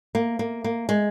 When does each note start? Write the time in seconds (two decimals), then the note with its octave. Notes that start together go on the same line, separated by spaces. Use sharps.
0.15 A#3
0.39 A#3
0.64 A#3
0.89 G#3